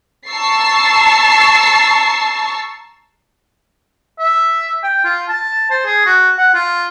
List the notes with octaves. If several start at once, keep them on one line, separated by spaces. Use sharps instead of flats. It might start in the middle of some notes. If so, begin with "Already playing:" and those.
A5 A#5 C#6 E6 A6 C7
E5
G5
F4
A5
C5
G#4
F#4
F#5
F4